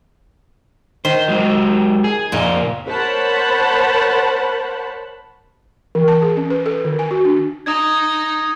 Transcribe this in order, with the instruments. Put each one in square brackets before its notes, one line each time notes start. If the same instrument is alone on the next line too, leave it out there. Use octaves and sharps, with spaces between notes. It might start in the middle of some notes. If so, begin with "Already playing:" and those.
[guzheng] D#3 [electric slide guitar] C5
[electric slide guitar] F#3 G#3 F#4
G#4
[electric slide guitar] F2 D#4 [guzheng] A#2
[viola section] A#4 C5 C#5 F#5 A5 B5
[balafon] E3
A5
G#4
C#4
B4
A4
D#3
G#5
F#4
D4
[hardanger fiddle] D#4 [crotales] D#6 G#6